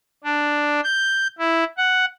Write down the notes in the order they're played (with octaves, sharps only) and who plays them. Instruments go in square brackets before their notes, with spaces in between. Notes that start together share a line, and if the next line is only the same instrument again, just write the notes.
[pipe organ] D4
G6
E4
F#5